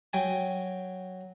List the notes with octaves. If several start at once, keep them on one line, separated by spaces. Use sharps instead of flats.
F#3 G5 G#5